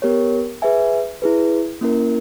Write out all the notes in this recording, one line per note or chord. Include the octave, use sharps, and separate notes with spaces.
B3 G4 A#4 C#5
G#4 B4 E5 G#5
E4 G#4 B4
A#3 C#4 E4 A#4